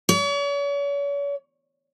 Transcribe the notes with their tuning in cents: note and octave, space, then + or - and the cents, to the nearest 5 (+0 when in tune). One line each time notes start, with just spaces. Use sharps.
C#5 +40